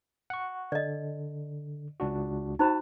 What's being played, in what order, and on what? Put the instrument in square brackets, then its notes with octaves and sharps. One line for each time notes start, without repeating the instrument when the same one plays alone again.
[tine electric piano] F#5 C#6
[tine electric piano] D3 [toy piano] D5 D#5
[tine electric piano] C#2 D4 F#4
[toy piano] D#4 C5 B5 [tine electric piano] F#4 A5